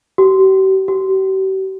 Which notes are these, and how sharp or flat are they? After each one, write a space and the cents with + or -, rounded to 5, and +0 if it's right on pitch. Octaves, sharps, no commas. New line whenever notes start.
G4 -45
G4 -45